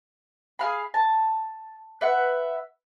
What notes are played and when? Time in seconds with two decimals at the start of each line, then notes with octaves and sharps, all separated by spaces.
0.59 G#4 F5 B5
0.94 A5
2.01 B4 E5 F#5